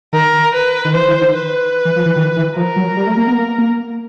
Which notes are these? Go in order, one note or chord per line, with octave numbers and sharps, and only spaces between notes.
D#3 A#4
B4
D#3
E3 C5
E3
D#3
B4
E3
F3
E3
D#3
E3
F3 A#4
F#3
G3
A3
A#3
B3
A#3
A#3